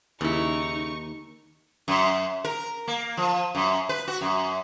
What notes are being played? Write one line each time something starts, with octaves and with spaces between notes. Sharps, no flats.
D#2 C#3 D#4 E4 C#6
F#2
A#4
A#3
F3
F#2
B4
F#4
F#2